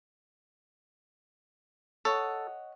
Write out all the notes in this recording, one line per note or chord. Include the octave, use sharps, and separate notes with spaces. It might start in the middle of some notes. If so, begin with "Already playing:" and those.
A4 C#5 D#5 F#5